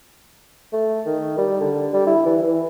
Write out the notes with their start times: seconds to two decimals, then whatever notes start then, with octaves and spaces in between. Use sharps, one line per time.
0.73 A3
1.06 D#3
1.38 G3
1.61 D3
1.93 G3
2.07 E4
2.26 E3
2.43 E3